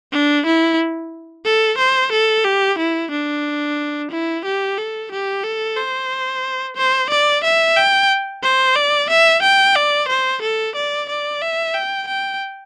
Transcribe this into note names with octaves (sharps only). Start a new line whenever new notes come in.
D4
E4
A4
C5
A4
G4
E4
D4
E4
G4
A4
G4
A4
C5
C5
D5
E5
G5
C5
D5
E5
G5
D5
C5
A4
D5
D5
E5
G5
G5